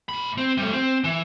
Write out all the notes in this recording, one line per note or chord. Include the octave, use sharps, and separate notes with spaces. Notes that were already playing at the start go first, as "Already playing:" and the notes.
A#2 B5
C4
G3 A3
C4
E3